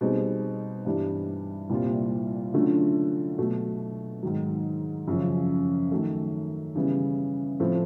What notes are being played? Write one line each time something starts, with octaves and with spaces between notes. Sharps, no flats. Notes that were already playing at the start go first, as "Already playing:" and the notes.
B2 G3 C4 D#4 G#4
G2 E3 G3
C2 A#2 G3 C4 F4
D3 F#3 A3 C#4 F4
B2 F#3 A3
G#2 D#3 F#3
F#2 C#3 F3
D#3 F#3 A3
C#3 E3 G3 B3
A2 F3 A3 C4